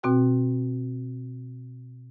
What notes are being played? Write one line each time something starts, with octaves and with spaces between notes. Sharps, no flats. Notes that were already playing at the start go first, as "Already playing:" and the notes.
B2 C4 F#4 G5